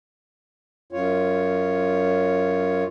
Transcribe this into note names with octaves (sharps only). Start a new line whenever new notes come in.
F#2 F4 C#5